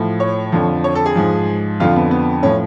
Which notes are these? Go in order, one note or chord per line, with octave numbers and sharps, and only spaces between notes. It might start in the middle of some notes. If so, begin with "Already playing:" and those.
Already playing: A2 F3
C#5
F2 D3 F3
C#5
A4
G#4
G#2 F3
F2 D3 F3 F4
B3
B3
A2 F3 C#4